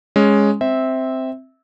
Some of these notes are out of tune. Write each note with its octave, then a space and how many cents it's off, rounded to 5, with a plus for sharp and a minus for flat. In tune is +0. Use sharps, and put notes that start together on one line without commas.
G#3 +0 C#4 +0
C4 +0 E5 -15